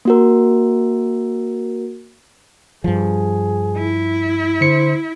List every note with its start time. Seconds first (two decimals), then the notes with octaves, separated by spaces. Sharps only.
0.05 A#3 F#4 A#4
2.84 G2 F3 G#4
3.78 E4
4.61 D3 C5 C#7